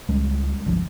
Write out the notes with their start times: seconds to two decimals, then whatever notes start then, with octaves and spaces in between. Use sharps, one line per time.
0.08 C#2 G3 G#3 C#4
0.66 G1 C2 F3